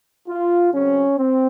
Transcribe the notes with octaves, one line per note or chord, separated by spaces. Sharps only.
F4
C#3 F#3 C4 C#4
C4